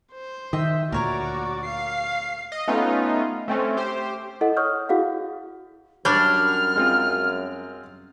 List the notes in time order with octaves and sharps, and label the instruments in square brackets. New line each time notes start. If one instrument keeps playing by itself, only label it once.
[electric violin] C5
[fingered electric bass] D#3 [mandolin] D#5 E5 G5
[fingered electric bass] D2 A#2 [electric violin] F#4 D5 [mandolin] A#4 C#5 A#5
[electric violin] F5 C7
[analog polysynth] D#5
A3 B3 C#4 D#4 F4
A3 C4 C#4
G4 C5
[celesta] E4 A4 D#5 F#5
C#5 C#6 D#6 F6 G6
E4 F#4 G#4 F5 F#5
[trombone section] F#2 [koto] G3 D4 [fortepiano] C#5 [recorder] F6
[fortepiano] G#3 C4 F4